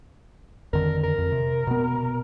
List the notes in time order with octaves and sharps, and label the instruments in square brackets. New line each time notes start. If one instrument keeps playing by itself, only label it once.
[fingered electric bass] F2 D3 D#3 [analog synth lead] A#4
[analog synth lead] A#4
[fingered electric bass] F2
C3
B2 B3